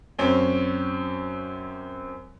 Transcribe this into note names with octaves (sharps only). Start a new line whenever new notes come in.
F#2 C4 C#4